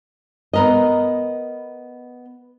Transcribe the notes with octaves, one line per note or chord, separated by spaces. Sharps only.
B3 A#4 D#5